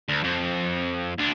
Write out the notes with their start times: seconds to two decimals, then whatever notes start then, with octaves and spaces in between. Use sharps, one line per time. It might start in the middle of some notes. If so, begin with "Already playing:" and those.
0.08 D2
0.24 F2
1.18 D2 D4